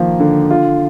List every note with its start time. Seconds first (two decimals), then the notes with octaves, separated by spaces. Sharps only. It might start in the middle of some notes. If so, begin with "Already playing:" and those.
Already playing: D#3 F3 A#3
0.20 D3
0.50 F4